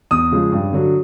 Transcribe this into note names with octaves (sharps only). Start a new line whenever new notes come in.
E2 D#6
C#3 F3 G#3
G2
D3 F#3